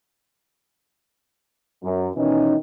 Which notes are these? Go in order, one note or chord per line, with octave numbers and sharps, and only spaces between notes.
F#2
B2 D#3 E3 C#4 D#4